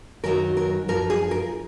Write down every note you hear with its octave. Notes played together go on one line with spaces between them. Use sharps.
F#2 D#3 F#3 A#4
A#4
F#2 F3 A#4
G#4
A#4